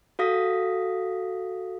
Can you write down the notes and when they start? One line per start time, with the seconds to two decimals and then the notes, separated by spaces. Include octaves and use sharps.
0.19 F#4 A4 F5 D#6 A#6 B6